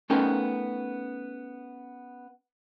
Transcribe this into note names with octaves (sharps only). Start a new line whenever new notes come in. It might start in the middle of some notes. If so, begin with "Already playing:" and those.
A3 B3 C#4 D#4 A#4 G5